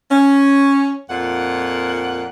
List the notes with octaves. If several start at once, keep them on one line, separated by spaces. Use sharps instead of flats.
C#4
F2 A#2 A#4 F#5